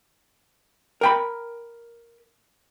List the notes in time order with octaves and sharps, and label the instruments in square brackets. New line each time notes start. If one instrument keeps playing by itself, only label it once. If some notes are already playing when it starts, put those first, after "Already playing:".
[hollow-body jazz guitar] A#4 G5 B5